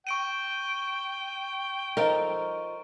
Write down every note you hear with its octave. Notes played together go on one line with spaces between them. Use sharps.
G5 C#6 D7 D#7
F3 D#4 A4 A#4